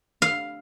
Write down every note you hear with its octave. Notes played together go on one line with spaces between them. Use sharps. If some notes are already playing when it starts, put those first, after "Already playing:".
F5